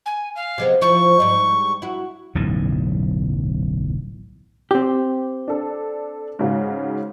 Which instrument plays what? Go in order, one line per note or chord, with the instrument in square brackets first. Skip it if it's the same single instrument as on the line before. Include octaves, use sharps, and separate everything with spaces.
[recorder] G#5
F5
[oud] C3 G#3 B3
[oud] F3 E4 [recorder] C#6
[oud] G#2 G3
E4 F#4
[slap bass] D1 B1 F#2 E3
[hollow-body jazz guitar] C4 G4
[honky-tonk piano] D4 A4
G#2 C#3 F#4